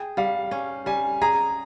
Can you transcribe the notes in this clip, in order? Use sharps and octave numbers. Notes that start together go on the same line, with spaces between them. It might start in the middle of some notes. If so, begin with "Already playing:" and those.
Already playing: G#4 G5
G3 F5
C#4
G3 G#5
G#4 A#5